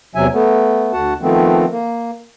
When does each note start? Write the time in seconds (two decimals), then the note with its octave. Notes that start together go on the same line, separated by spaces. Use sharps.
0.15 E2 C3 F#3 E5 G#5
0.33 A3 B3
0.93 D2 F#4 F#5 A5
1.21 D#3 F3 A3 B3 C4
1.71 A#3